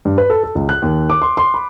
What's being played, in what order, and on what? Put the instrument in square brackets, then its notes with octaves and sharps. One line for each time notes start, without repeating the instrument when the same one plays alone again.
[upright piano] G2
B4
A4
A4
C#2
F#6
D#2
D6
C6
C6
B5